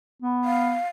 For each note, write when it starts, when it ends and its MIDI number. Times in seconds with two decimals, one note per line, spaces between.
0.22 0.76 59
0.45 0.88 77